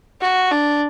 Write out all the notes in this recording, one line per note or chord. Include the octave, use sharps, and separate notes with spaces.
F#4
D4